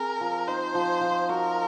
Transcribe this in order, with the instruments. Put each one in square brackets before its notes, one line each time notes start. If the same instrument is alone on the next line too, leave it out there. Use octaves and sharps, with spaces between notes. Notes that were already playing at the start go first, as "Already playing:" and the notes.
Already playing: [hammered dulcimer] C4 G#4 [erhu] A#4
[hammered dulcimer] F3
[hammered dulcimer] D#4 [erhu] C5
[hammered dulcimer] F3
F3
[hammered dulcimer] F#4 [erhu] A#4